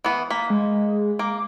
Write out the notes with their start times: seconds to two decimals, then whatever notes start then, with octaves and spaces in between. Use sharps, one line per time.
0.04 E3 B3
0.30 A#3 B6
0.50 G#3
1.19 A#3 D6